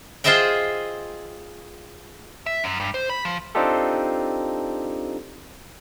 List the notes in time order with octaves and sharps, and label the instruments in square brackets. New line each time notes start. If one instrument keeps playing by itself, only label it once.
[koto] F4 G#4 C5 D#5 E5 G5
[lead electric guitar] E5
F#2
G2
C5
B5
F3
[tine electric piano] C4 D4 D#4 F4 G4 A4